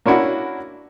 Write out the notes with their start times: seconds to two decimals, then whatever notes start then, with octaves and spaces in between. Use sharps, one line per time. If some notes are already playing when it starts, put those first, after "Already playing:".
0.05 A#3 C#4 D4 E4 F#4